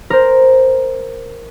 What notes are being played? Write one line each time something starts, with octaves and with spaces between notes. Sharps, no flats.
A#4 C5